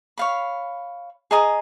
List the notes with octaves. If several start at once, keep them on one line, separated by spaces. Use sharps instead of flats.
C#5 F5 B5
G#4 D#5 A#5 D#6